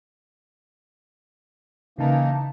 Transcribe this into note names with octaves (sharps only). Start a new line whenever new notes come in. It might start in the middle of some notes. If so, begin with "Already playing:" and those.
C#3 E3 A#3 D#4 A5